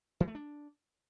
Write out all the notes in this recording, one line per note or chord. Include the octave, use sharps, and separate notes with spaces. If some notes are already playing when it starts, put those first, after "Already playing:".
E3
A3
D4